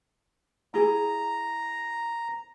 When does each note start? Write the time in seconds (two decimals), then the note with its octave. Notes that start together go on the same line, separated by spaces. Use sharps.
0.74 E4 G#4 A#5